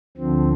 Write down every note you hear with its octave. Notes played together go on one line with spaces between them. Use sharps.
D2 D3 F3 C4